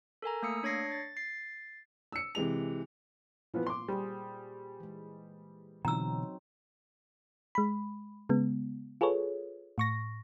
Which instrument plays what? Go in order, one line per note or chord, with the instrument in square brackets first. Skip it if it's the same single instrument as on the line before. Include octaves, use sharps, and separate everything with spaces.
[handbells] A4 A#4 G#5 A#5
A3 A#3 D#6 E6 C#7
D4 C#5 G#6 A#6 C7 C#7
A6
A6 C7
[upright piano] E6 C#7
C3 E3 G#3 F7
[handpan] A#2 [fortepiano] E3 F3 B3
[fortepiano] C6 D6
[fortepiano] G3 [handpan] G#4 C5
[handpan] E3 G#3
[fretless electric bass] B2 D3 E3 [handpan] F#3 C4 D#4 [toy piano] A#5 E6
[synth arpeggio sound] G#3 B5
C#3 G#3 B3
F4 G#4 A4 B4 C#5
A2 C#6 A#6